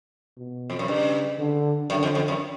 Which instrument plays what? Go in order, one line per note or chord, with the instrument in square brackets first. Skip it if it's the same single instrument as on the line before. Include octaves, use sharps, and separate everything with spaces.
[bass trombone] B2
[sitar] F2
F#2
[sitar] G2 [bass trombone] C#3
[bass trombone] D3
[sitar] F#2 [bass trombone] D3
[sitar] F2
F2
F#2